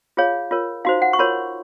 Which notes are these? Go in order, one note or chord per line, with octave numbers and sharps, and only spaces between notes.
F4 G#4 C#5 F5
F4 A#4 C#5
D#4 F#4 C5 F5
F#5
C#6
F4 A#4 C#5 C6